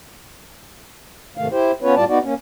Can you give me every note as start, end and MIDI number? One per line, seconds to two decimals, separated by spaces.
1.37 1.48 44
1.37 1.48 48
1.37 1.48 51
1.37 1.48 57
1.37 1.48 77
1.51 1.72 64
1.51 1.72 67
1.51 1.72 72
1.82 1.95 59
1.82 1.95 61
1.82 1.95 65
1.82 1.95 71
1.82 1.95 73
1.96 2.04 45
1.96 2.04 55
1.96 2.04 65
1.96 2.04 74
1.96 2.04 81
2.08 2.19 59
2.08 2.19 63
2.08 2.19 66
2.08 2.19 74
2.24 2.34 58
2.24 2.34 61